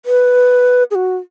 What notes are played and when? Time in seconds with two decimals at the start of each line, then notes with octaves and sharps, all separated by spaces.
0.06 B4
0.91 G#4
0.95 F#4